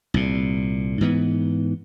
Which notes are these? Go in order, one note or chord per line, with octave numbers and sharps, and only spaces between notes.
C2 A#2
G#2 E3 B3